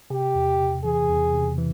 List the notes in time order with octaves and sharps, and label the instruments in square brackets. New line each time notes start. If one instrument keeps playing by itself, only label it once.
[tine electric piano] C3 [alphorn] G4
[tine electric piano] E2
C3
[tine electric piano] E3 [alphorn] G#4
[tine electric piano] E2
C3
E3